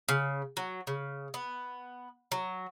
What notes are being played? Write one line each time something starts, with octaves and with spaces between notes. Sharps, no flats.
C#3
F#3
C#3
B3
F#3